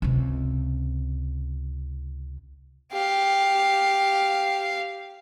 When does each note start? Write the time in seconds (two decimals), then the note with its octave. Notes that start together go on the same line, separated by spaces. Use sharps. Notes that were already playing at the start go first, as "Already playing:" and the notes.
0.02 C#2 C3
2.92 G4 F5